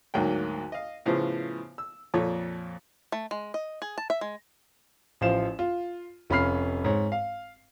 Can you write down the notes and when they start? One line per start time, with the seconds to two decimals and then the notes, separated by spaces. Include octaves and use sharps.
0.14 D2 G#2 F#3 A#3 G5
0.72 D#5 F5
1.06 A2 C#3 F3 B3 C5
1.78 E6
2.14 F2 A#2 A4 C#5
3.12 A3
3.31 G#3
3.54 D#5
3.82 G#4
3.98 A5
4.10 E5
4.21 G#3
5.21 A1 F3 C5 F5 E7
5.59 F4
6.30 F1 C#4 F4 B5 F6 C7
6.84 G#2 C#5
7.12 F5